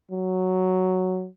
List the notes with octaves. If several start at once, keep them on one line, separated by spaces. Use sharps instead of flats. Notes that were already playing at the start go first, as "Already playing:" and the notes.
F#3